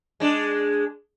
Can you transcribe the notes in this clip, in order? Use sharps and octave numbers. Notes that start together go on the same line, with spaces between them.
G#3 D4